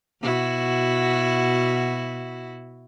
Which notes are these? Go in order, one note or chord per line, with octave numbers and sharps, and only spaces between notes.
B2 E4 F#4